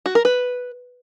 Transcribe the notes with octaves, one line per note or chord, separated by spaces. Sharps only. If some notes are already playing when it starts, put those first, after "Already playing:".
F#4
A#4
B4